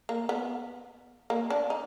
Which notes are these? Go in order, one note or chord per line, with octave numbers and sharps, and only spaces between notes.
A#3
B3
A#3
D4
D#4